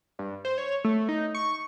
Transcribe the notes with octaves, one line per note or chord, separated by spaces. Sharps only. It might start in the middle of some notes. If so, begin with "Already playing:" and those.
G2
C5
C#5
A3
D#4
C#6